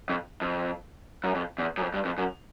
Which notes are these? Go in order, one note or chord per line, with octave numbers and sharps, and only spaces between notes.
F2
F2
F#2
F2
E2
F#2
F2
G2
F2
F#2